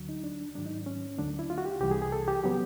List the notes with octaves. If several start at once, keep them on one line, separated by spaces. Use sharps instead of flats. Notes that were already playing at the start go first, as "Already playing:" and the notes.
Already playing: D2 D3 F#3
D#4
D4
G#2 D#3 F#3 D4
D#4
C#4
D2 D3 F#3 A3 D4
E4
F4
F#4
G4
C2 C3 E3 G3 G4
G#4
G#4
A4
G4
C#3 F#3 B3 G4